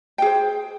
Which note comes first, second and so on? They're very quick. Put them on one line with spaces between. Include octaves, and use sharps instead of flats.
G5 G#4 C5